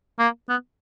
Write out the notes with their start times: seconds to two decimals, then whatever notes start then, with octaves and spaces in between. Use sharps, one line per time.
0.19 A#3
0.49 B3